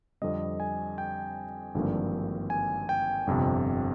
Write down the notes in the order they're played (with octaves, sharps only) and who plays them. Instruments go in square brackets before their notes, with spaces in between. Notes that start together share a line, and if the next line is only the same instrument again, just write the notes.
[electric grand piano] F2 D3 G3 C4 D#5
G#5
G5
G#1 G2 D3 F3 A#3
G#5
G5
G1 F2 C3